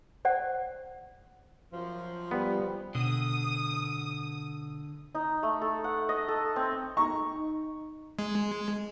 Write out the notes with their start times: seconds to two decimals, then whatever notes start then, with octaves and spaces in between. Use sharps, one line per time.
0.25 C5 D5 F#5
1.71 F#2 F3
2.31 G3 B3
2.95 B2 D3 D#6
5.15 D#4
5.43 A3
5.61 A4
5.84 F#5
6.09 D#5
6.28 A4
6.56 C4
6.97 D#4 A#5 C#6
8.19 G#3